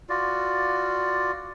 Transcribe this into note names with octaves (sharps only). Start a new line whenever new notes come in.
F4 F#4 D5